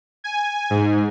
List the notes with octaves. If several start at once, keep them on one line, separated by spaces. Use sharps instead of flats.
G#5
G#2